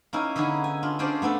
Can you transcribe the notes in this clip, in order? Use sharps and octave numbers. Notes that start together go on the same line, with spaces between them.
A#3 C#4 D#4 E4
D3 B3 C#4 D#4 E4 G#4
G#5
D4 F4
C#4 D4 G#4 C5 D5
A3 B3 D4 A4